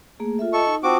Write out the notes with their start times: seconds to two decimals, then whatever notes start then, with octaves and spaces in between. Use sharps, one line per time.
0.20 A3 A#3 G#4
0.39 F4 A4 E5
0.53 A4 D#5 C#6
0.67 D#4
0.83 C4 F4 F#4 A5 D6 D#6